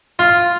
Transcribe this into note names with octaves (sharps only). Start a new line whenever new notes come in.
F4